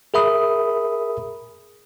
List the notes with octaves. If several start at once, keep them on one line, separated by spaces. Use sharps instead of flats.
G#4 A#4 E5 B5 D#6